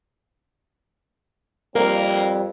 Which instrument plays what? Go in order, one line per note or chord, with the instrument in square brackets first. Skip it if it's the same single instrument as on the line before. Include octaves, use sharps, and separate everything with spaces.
[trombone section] F2 G3 C4 [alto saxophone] A#3 [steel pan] A#4